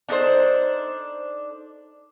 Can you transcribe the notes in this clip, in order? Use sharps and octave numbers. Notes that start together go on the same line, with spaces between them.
D4 D#4 A4 C5